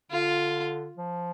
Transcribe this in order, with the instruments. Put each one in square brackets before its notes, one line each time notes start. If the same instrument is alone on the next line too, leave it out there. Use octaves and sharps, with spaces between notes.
[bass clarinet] D3 [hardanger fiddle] F4
[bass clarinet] F3